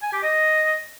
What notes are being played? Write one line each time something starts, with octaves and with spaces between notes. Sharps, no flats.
G#5
G4
D#5